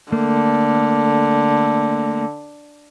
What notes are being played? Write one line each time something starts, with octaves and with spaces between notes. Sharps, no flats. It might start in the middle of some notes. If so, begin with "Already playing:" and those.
D3 A3 A#3